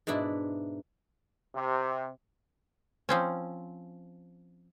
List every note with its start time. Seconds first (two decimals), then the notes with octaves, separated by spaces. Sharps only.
0.07 G#2 B2 D4 E4
1.55 C3
3.09 F3 C4 C#4